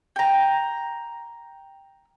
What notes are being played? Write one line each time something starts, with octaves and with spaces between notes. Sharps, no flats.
G5 A#5